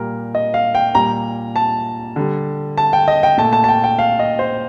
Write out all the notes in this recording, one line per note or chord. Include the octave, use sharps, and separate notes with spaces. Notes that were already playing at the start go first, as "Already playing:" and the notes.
Already playing: A#2 G3 A#4
D#5
F5
G5
A#2 G3 A#5
A5
D3 G3
A5
G5
D#5
G5
A#2 A3 A5
A5
A5
G5
G5
F5
D#5
C5